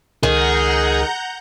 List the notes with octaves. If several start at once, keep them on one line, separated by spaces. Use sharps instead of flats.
C#2 D#3 G#4 F#5 A#5 G6